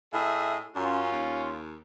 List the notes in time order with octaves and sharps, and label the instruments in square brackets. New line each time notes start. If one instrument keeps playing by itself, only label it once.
[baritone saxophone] A2 [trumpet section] G#4 D#5 E5
[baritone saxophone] F#2 [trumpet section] C#4 F4
[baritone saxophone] D#2